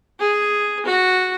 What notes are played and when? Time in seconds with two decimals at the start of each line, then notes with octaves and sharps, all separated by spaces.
0.19 G#4
0.86 F#4